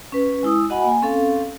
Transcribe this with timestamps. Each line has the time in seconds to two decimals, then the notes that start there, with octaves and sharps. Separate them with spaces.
0.12 C#4 B4
0.43 G#3 E4 D#6 E6
0.70 F#4 D#5 F#5 G#5 B5
0.84 A#3 G#5
1.02 C4 C#4 A4 F5